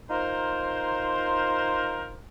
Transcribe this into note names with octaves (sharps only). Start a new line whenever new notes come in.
D#4 F4 A#4 C5